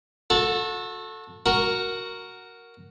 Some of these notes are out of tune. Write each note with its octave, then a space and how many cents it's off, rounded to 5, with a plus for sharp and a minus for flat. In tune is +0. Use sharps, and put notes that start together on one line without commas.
F#4 -35 A4 +0
F#4 +0 A#4 +0